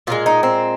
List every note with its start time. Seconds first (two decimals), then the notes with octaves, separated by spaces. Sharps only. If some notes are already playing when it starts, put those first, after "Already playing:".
0.07 A#2 F3 G#3 F4
0.26 D#4
0.43 C4